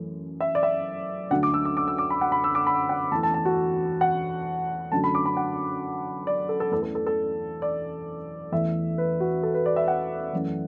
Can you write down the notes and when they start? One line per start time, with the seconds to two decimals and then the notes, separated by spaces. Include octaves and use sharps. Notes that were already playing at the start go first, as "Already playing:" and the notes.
Already playing: F#2 E3 A3
0.41 E5
0.55 D5
0.63 E5
1.31 D2 D3 F#3 A3 F#5
1.43 D6
1.54 E6
1.65 D6
1.77 D6
1.88 E6
1.98 D6
2.10 B5
2.21 F#5
2.32 B5
2.44 E6
2.55 D6
2.67 B5
2.89 F#5
3.12 E2 E3 A3 A5
3.23 A5
3.34 A5
3.45 F#4
4.01 F#5
4.92 F#2 D3 F#3 A3 A5
5.04 B5
5.15 D6
5.26 B5
5.37 F#5
6.27 D5
6.49 A4
6.60 A4
6.72 E2 E3 A3 A4
6.83 A4
6.95 A4
7.07 A4
7.62 D5
8.52 E2 E3 A3 E5
8.98 B4
9.20 F#4
9.43 A4
9.54 B4
9.66 D5
9.76 E5
9.88 F#5
10.33 F#2 E3 A3